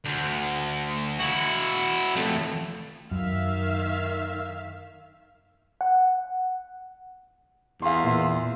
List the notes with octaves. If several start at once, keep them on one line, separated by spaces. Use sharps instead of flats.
D2
E4 F#4
F2 A3
F#2 D#3 E5 F5
F#5
E2 F5 C6
A#2 E3 E5